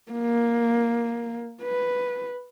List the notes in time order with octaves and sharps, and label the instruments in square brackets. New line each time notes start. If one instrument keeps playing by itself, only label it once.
[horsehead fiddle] A#3
B4